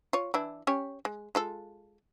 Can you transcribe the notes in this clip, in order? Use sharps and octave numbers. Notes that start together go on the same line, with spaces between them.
F4 C#5
E3 D4 E4
C#4 G4 C#5
G#3
G#3 F4 A4